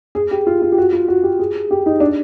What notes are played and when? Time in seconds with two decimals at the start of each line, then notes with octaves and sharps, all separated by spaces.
0.15 G#4
0.31 G4
0.47 F4
0.62 F4
0.72 G4
0.78 F#4
0.92 F4
1.08 F#4
1.23 G4
1.39 G#4
1.71 G4
1.86 D#4
2.00 D4